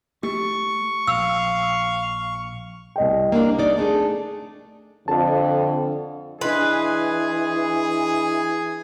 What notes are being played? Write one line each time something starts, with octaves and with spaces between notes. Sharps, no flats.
A3 G4 C#6
A#1 F5 E6
C2 D#5 G5
A#3 D4
D#4 D5
A3 D4 G#4
F2 D3 A4 A5
E3 D4 G#4 B4 D#5 C6